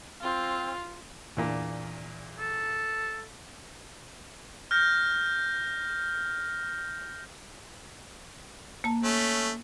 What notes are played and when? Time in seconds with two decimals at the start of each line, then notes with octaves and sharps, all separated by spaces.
0.21 C4 F4
1.37 E2 A#2 D4
2.39 A4
4.71 F6 G6 A#6
8.84 A#3 A5
9.03 A3 C#4